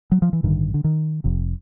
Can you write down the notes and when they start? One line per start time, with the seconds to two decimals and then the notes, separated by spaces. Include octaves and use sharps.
0.12 F#3
0.22 F3
0.33 E3
0.43 A1 G2 D3 D#3
0.74 D3
0.84 D#3
1.24 F1 F2 C3